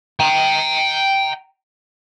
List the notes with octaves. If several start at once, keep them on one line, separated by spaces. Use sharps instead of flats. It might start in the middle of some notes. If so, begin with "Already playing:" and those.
G5 A#5